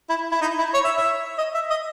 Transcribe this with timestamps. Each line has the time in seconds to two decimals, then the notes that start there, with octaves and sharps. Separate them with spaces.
0.10 E4
0.32 E4
0.41 D#4
0.59 E4
0.74 C#5
0.85 E5
0.96 E5
1.38 D#5
1.54 E5
1.70 D#5